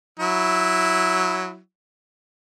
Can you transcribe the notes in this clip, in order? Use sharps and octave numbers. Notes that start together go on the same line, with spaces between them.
F#3 E4